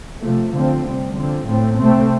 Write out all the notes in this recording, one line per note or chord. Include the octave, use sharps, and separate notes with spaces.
C3 F3 A3
D3 F3 A3 C4
C3 G3 C4
D3 F3 C4
A2 A3 C4
C3 A3 C4